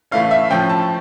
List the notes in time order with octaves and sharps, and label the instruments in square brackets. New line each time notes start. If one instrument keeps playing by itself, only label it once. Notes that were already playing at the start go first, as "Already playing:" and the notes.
[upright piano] A2 E3 A3 C#4 F5
E5
A2 F3 C#4 G5
A5